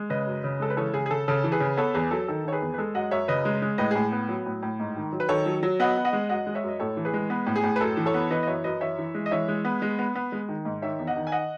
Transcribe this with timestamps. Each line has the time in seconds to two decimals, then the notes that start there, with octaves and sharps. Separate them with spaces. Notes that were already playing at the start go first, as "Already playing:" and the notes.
Already playing: G#3
0.10 C#3 B4 D#5
0.27 F#2
0.44 C#3
0.60 G#3 A4
0.70 B4
0.77 E3 A4 C#5
0.94 C#3 G#4
1.06 G#4
1.11 C#3 A4
1.28 C#3 A4
1.44 E3
1.52 G#4 B4
1.60 C#3
1.77 B3 A4 C#5
1.94 E2 G#4 B4
2.11 F#3 A4
2.28 D#3 A4
2.44 D#3 C#5
2.52 G#4 B4
2.61 E2
2.74 B4
2.78 G#3 A4
2.94 F#2 D#5 F#5
3.11 F#2 C#5 E5
3.28 C#3 B4 D#5
3.45 G#3
3.62 G#3
3.78 A2 B4 D#5
3.91 A2 G#4
4.12 B3
4.29 F#3
4.46 A2
4.62 A2
4.80 G#2
4.96 D#3
5.13 F#3
5.20 B4
5.29 D#3 A4 C#5
5.46 F#3
5.63 F#3
5.80 B3 D#5 F#5
5.97 B3
6.05 D#5 F#5
6.13 G#3
6.29 F#2 D#5 F#5
6.46 G#3
6.55 C#5 E5
6.63 F#2
6.68 D#5
6.80 A2 A4 C#5
6.97 E3
7.05 G#4 B4
7.13 G#3
7.30 B3
7.47 A2
7.56 G#4
7.63 A2
7.76 B4
7.81 F#2 A4
7.97 E3
8.06 A4 C#5
8.14 B3
8.30 E3 B4 D#5
8.43 D#5
8.47 F#2 C#5 E5
8.64 F#2 B4 D#5
8.81 E3 C#5 E5
8.98 E3
9.15 G#3
9.26 D#5
9.31 E3 C#5 E5
9.48 G#3
9.65 B3
9.82 G#3
9.99 B3
10.15 B3
10.32 G#3
10.49 D#3
10.65 G#2
10.82 D#3 C#5 E5
10.99 E2
11.07 D#5 F#5
11.16 D#3
11.27 G#5
11.32 D#5 F#5